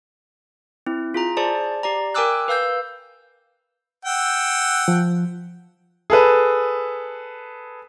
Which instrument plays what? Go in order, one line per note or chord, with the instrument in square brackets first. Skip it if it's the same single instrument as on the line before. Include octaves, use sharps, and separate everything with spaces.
[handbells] C4 E4
F4 G#4 A#5
G#4 C5 D5 A5
G4 D5 A#5
A#4 G5 G#5 D6 E6 F#6
B4 F5 E6 G6
[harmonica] F#5 G5 E6
[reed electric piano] F3
[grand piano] G#4 A4 B4